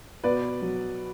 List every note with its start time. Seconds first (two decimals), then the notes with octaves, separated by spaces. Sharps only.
0.24 B2 B4 D5
0.62 F#3